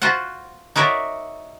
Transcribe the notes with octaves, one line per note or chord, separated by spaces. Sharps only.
F4 F#4 C5 F#5
D#4 F#4 A#4 C#5 D5 E5